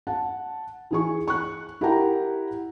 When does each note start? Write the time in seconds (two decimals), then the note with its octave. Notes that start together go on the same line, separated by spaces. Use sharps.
0.07 F#5 A5
0.91 E3 G#4 C#6
1.28 C#6 F#6
1.81 E4 G4 A#4 F#5 G5 A#5